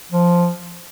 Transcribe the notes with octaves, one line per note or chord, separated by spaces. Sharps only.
F3